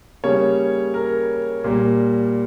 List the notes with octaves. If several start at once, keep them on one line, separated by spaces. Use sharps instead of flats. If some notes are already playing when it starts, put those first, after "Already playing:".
C#3 G3 A#3 C#5
A#4
A#2 G3 A#3